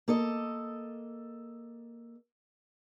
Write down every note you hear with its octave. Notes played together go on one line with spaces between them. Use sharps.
A#3 A4 D#5